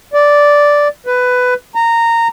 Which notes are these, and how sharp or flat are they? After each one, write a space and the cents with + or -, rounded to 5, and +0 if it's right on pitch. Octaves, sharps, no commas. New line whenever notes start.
D5 -5
B4 +15
A#5 -15